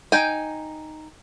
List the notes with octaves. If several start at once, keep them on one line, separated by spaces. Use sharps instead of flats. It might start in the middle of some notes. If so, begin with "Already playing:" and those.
D#4 G5 G#5